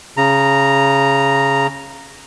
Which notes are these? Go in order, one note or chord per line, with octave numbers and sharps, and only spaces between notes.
C#3 A#5